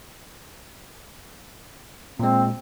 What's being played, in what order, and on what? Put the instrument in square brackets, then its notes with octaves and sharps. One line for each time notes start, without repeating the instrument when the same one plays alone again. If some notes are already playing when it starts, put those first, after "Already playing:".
[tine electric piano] A#2 G#3 [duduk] C4